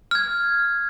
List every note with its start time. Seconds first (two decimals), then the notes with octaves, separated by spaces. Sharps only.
0.11 F6 G#6